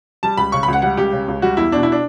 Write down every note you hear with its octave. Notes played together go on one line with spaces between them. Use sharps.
G3 A5
C#2 B5
C#3 C#6
B5
C#2 F#5
G3 F#5
C#2 G4
C#3
C#2
G3 F#4
E2 E4
B2 D4
E4
D4